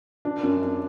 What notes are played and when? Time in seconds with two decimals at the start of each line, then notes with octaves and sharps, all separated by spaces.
0.25 D4
0.43 F#2
0.62 D4